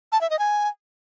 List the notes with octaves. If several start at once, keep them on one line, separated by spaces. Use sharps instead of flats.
A5
E5
D#5
G#5